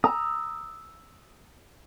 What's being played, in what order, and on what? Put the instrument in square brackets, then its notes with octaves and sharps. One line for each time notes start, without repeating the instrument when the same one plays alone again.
[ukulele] A#5 [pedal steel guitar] D#6 E6